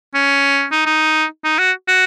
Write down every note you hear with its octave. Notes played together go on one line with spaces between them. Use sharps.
C#4
D#4
D#4
D#4
F#4
F#4